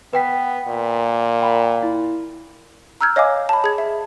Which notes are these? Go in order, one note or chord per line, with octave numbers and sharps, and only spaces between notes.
B3 B4 G5 B6
A#2
G5 B5
E4
A#5 E6 F6 G6 G#6
C#5 D#5 F5 G#5 D6
A5 B5
G#4 G#6
E5